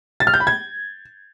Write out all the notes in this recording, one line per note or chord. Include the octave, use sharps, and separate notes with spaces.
A6
F6
G6
B5
G#6